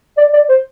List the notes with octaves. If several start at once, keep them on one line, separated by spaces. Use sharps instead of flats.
D5
D5
C5